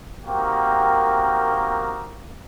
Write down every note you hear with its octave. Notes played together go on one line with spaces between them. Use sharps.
A#3 C4 D#4 F#4 G4 A#4